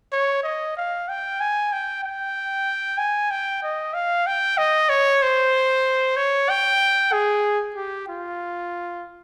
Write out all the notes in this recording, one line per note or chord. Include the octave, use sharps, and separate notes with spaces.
C#5
D#5
F5
G5
G#5
G5
G5
G#5
G5
D#5
F5
G5
D#5
C#5
C5
C#5
G5
G#4
G4
F4